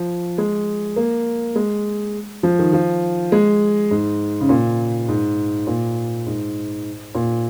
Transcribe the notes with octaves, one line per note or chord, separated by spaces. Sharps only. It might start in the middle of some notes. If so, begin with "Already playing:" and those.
Already playing: F3
G#3
A#3
G#3
F3
D#3
F3
G#3
G#2
C#3
A#2
G#2
A#2
G#2
A#2